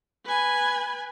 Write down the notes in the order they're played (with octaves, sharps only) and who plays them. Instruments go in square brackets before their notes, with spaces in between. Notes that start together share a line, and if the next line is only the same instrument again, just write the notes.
[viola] B4 G#5